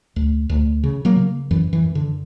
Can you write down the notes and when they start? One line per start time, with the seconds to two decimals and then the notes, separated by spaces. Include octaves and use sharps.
0.16 D2
0.50 D2
0.84 C#3
1.05 F#3 A#3
1.16 C#3
1.51 F#2 E3
1.73 E3
1.84 F#2
1.95 D3